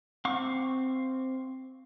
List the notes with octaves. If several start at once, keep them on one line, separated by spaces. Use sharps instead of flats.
C4 F5 C#6 D6